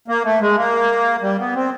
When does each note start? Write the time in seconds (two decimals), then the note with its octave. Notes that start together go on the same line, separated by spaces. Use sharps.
0.08 A#3
0.25 A3
0.41 G#3
0.57 A#3
1.22 G3
1.40 B3
1.55 C4